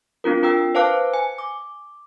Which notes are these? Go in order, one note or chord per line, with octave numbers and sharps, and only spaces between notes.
C4 D4 F4 A#4
F4 A#4 G5 E6
B4 C5 F5 A5 D6 F#6
G#5
D6